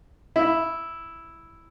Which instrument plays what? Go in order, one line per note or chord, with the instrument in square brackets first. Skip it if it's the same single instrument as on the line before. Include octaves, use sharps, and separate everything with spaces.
[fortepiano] E4